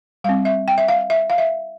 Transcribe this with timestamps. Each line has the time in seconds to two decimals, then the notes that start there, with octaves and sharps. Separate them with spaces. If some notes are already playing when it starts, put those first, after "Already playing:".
0.24 G3 C4 F5
0.45 E5
0.68 G5
0.78 E5
0.88 F5
1.10 E5
1.30 F5
1.38 E5